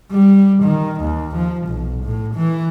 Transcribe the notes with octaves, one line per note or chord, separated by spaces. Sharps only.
G3
D#3
D#2
F3
B1
A2
E3